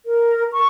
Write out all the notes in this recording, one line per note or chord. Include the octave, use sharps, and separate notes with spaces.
A#4
C#6